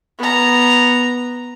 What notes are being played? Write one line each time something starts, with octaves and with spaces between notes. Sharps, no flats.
B3 A#5